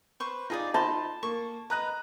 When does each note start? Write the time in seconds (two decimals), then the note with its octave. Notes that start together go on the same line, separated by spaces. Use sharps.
0.20 B4 C5 C#6
0.50 D#4 F4 G#4 D5
0.74 D#4 A5 B5 C6
1.23 A#3 C#6
1.70 B4 D#5 A#5 F#6